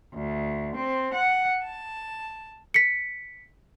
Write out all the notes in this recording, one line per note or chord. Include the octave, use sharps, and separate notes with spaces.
D2
C4
F#5
A5
B6 C#7